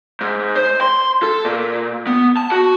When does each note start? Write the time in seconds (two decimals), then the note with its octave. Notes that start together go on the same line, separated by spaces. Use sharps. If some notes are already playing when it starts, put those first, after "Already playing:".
0.21 G#2
0.55 C5
0.81 C6
1.23 A4
1.45 A#2
2.07 B3
2.37 A5
2.52 F#4